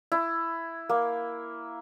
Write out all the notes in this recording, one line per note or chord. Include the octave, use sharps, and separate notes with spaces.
E4
A#3